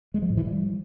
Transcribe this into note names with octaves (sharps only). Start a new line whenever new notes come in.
G#3
F3
A2
E3
G3